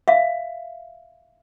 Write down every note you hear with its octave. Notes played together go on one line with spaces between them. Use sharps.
E5 F5